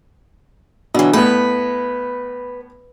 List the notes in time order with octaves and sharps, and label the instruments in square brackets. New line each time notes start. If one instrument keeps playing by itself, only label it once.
[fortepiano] B2 E3 [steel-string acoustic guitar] D3 F#3
[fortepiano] A2 B3 [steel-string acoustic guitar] B4